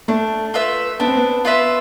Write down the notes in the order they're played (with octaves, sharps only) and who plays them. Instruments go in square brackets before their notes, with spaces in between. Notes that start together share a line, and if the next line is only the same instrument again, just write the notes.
[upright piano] A3 [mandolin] D4
[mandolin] F4 B4 E5
[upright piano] B3 [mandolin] D4
[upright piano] C4
B3
[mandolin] F4 B4 E5